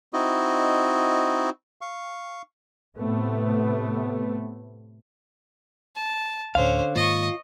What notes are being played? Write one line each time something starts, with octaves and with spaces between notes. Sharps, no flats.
C4 D#4 E4 F#4 D#5
F5 C#6
A2 C3 A3 B3
A5
D2 A2 D3 C#4 C5 F5
G#2 D#3 A#3 F4 D#5 C#6